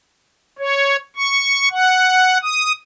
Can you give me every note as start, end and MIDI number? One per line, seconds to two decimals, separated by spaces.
0.59 0.97 73
1.16 1.69 85
1.71 2.38 78
2.43 2.72 87